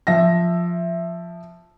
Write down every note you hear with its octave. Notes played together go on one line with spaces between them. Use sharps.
F3 E5 A#6